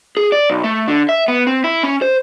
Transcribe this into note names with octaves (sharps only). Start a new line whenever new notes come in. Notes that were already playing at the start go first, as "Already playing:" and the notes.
G#4
D5
B1
A3
D3
E5
B3
C4
E4
C#4
C5